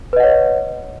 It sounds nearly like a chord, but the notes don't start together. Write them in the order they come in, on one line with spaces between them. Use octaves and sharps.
B4 D#5 F#5 C#5